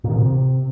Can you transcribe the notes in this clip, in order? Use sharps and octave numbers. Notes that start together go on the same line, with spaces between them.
A#2
D#3
C3